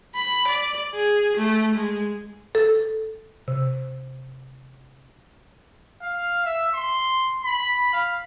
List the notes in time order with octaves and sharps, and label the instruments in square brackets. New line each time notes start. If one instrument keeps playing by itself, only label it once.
[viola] B5
D5
G#4
A3
G#3
[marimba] A4
C3
[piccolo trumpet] F5
E5
C6
B5
F5